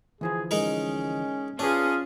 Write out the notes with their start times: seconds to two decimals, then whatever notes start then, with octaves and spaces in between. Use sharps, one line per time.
0.21 D2 E3 F3 G#4
0.51 G#3 C#4 D#4 A#4
1.59 C#4 D4 F4 G#4 B4 C#5